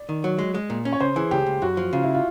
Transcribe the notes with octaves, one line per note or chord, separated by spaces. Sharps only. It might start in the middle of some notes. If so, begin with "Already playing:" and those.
Already playing: D5
D#3
F#3
G#3
G#3
A#2
C#4
C#5
C#3 C5
E3 G#4
C#2 G4
C#2
F#2 F#4
F3
C#3 F4
E4
F4